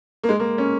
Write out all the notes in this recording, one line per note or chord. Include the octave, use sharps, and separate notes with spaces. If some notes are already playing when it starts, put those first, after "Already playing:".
A#3
G#3
A#3
C#4